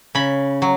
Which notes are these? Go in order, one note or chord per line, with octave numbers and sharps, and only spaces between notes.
C#3 B5
F#3